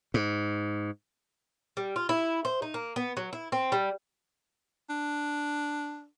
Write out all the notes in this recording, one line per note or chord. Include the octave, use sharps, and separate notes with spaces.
G#2
G3
F4
E4
C5
D#4
A#3
B3
F#3
E4
C4
G3
D4